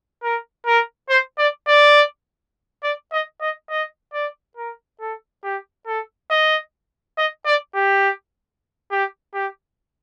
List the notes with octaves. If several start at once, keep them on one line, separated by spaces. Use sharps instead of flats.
A#4
A#4
C5
D5
D5
D5
D#5
D#5
D#5
D5
A#4
A4
G4
A4
D#5
D#5
D5
G4
G4
G4